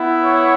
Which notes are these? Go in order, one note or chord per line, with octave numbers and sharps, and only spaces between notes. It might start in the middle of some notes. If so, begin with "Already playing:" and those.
Already playing: B3 E4
C#5